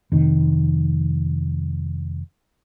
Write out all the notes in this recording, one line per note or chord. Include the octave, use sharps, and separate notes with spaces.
F1 D#3